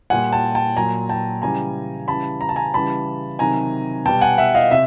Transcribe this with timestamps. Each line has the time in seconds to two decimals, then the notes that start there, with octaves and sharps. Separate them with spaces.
0.10 A#2 G3 F#5 G#5
0.33 G5 A5
0.55 G5 A5
0.76 A#2 F#3 G#5 A#5
1.09 G5 A5
1.42 C#3 E3 G3 G#5 A#5
2.08 C#3 E3 G3 A5 B5
2.41 A#5
2.49 A5
2.56 G#5 A#5
2.74 C#3 E3 G3 A5 B5
3.39 C3 D#3 F#3 G#5 A#5
4.06 B2 G3 G5 A5
4.21 F#5 G#5
4.38 E5 F#5
4.55 D#5 F5
4.71 C3 E5